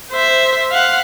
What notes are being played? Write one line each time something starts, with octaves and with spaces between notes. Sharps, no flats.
C5 E5
F5 F#5